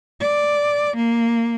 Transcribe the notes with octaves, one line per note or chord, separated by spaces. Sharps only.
D5
A#3